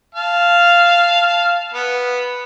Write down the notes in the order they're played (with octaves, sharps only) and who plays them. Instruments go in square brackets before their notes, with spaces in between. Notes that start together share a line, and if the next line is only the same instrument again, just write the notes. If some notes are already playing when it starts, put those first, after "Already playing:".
[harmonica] F5 A5
B3